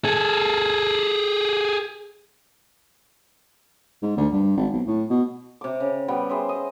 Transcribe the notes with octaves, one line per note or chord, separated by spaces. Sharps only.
G#4 A4
G#2
D2
G2
G#1
B1
A2
B2
C3 D6
C#3
G3 B3 G5
G#4 C5 E5
D#5